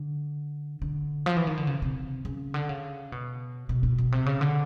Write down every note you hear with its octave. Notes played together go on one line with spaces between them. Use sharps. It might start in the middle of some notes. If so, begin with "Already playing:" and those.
Already playing: D3
D3
F3
E3
D#3
D3
C#3
C3
C#3
D3
C#3
B2
B2
B2
B2
C3
C#3
D3